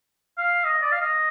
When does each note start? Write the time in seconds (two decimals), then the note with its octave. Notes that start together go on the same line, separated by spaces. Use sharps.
0.38 F5
0.64 D#5
0.82 D5
0.92 F5
1.00 D#5